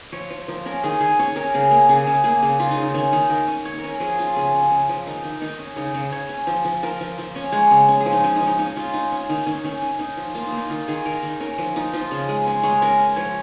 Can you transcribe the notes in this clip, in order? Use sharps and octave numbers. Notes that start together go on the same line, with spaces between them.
F3 C#5
F3
F3 A#4
C#4 A#4
D#3 G#4
D#3 G#4
C#4 C#5
C#4 A#4
C#3 G#4
A#3 A#4
C#3 G#4
C#3
A#3 G#4
C#3
C#3 F4
D#4
C#3
D#4
D#3 C#4
D#3 D#4
D#3 A#4
C#4
C#4 C#5
A#4
C#4
A#4
F3 G#4
C#4 F4
C#3 G#4
C#3
C#3
F3
D#3 D#4
D#3
D#3 D#4
C#4
C#3 D#4
C#3
C#3 C#5
C#4
F3
F3
F3 A#4
F3
F3
C#4
G#3 C#5
C#3
C#4
G#4
F3
D#4
F3 C#4
D#4
F3
D#4
C#4 D#4
C#4 F4
C#4 D#4
C#4
D#3 D#4
D#3 C#4
D#3 C#4
C#4
C#4 D#4
F3
A#3 F4
D#4
A#3
D#4
D#3 F4
D#3 G#4
D#3 A#4
D#3
C#4 A#4
F3
F3 D#4
F3 F4
C#3
G#3
C#4
G#3 C#5
C#4 A#4
C#4
F3 C#5